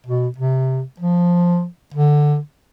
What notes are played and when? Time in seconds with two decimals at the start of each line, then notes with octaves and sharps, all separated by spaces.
0.06 B2
0.38 C3
1.00 F3
1.94 D3